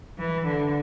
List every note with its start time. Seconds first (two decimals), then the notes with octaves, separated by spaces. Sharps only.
0.19 E3
0.47 D3